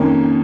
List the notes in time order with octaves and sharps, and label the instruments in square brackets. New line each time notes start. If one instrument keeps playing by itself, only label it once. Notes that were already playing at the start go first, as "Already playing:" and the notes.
Already playing: [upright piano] F2 D#3 A#3 C#4